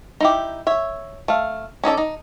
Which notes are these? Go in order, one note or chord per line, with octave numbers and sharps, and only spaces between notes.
D#4 E4 G4
C#5 E5
A3 F5
C#4 D#4 A4 D5
D#4